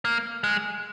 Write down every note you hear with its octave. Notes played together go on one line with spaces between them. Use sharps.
A#3
G#3